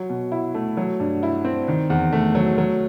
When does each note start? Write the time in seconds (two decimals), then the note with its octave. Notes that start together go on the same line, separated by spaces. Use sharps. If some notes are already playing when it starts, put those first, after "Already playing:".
Already playing: F#3
0.09 B2
0.32 E4
0.54 A3
0.77 F#3
1.00 G2
1.23 E4
1.45 C4
1.68 D#3
1.90 E2
2.13 A3
2.35 F#3
2.58 F#3